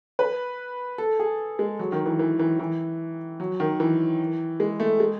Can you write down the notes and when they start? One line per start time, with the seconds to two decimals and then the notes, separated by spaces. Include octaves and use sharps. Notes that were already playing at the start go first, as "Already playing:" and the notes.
0.19 B4
0.98 A4
1.20 G#4
1.59 G#3
1.79 F#3
1.92 D#3
2.06 E3
2.19 E3
2.39 E3
2.59 E3
3.40 F#3
3.60 D#3
3.80 E3
4.60 G#3
4.80 A3
5.00 G#3